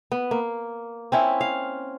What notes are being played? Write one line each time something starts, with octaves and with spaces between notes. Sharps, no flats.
B3
A#3
C4 C#4 E4
F5